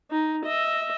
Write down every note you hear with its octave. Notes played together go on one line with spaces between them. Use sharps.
D#4
D#5 E5